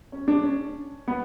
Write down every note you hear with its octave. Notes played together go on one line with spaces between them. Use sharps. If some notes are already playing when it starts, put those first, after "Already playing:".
C#4
D4
C#4
B3